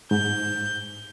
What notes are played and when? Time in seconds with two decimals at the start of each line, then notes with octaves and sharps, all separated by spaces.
0.11 G#2 G6